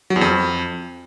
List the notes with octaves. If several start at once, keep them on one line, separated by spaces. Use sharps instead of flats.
F#3
E2
F2